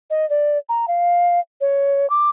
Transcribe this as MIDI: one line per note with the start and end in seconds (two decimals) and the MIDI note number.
0.10 0.28 75
0.30 0.58 74
0.69 0.86 82
0.88 1.40 77
1.61 2.09 73
2.10 2.30 86